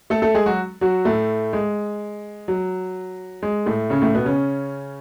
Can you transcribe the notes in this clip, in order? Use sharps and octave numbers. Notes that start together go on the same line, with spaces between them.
A3 A4
A3 A4
G#3 G#4
F#3 F#4
F#3 F#4
A2 A3
G#3
F#3
G#3
A2 A3
C#3 C#4
A2 A3
B2 B3
C#3 C#4